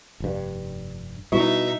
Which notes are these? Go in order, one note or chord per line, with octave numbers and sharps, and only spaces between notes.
F1 G2
B2 G3 D#4 E4 E5